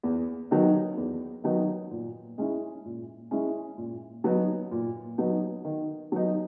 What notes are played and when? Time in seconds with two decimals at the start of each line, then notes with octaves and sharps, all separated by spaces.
0.03 E2
0.51 D#3 F#3 B3 D#4
0.97 E2
1.44 D#3 F#3 B3 D#4
1.91 A#2
2.38 G#3 C#4 E4
2.85 A#2
3.31 G#3 C#4 E4
3.77 A#2
4.24 F#3 B3 D#4
4.71 A#2
5.18 F#3 B3 D#4
5.65 D#3
6.12 F#3 B3 D#4